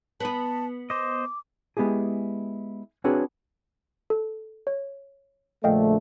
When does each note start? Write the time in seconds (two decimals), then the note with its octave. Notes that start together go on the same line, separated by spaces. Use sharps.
0.20 B3 B4 A5
0.90 C5 D#5 D6
1.77 G#3 B3 E4 G4 G#4
3.04 C4 D4 F#4 G#4 B4 C#5
4.10 A4
4.67 C#5
5.64 A#1 D3 A3 D#5 F5 G5